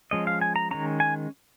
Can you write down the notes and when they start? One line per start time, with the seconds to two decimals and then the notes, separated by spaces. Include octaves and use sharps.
0.11 F3 G#3 C#4 D#5
0.27 F5
0.41 G#5
0.56 A#5
0.71 D#3 G#3 C#4 A#5
1.00 G#5